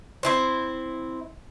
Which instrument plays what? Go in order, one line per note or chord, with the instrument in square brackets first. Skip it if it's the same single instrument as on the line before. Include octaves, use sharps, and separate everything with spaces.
[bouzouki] C4 E4 C5